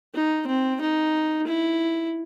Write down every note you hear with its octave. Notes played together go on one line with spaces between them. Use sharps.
D#4
C4
D#4
E4